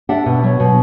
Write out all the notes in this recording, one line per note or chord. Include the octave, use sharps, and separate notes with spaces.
D4 E5 F#5
B2
F#3
B2